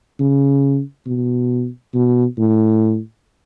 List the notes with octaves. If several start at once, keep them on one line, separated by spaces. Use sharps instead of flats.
C#3
B2
B2
A2